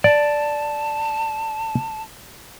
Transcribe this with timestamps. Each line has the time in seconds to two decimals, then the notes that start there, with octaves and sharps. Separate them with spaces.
0.04 D5 A5